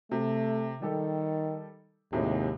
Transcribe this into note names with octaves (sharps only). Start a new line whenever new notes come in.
C3 A3
D#3 G3 G4 A4
D#2 A2 C3 G#3